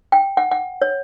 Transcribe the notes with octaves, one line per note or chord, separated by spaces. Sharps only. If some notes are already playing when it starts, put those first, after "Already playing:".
G5
F#5
F#5
C#5